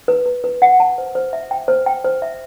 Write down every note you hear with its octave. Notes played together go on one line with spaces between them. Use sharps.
B4
B4
B4
F#5
A5
C5
C5
E5
G5
C5
G5
C5
E5